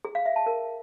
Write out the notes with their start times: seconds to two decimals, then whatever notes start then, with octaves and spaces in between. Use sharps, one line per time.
0.05 G#4
0.15 F5
0.25 E5
0.36 A5
0.46 A#4